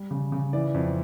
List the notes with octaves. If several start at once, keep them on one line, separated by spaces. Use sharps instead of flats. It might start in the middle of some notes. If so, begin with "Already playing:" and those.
Already playing: G3
C#3
C#3
E3 D5
F2